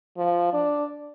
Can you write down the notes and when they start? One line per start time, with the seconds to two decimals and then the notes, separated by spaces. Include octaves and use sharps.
0.18 F3
0.53 D4